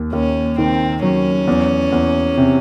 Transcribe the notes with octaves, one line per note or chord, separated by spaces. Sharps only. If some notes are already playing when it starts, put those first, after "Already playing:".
Already playing: D#2
D#2 C#4
D#3 C4
F#3 C#4
E2
E2
C3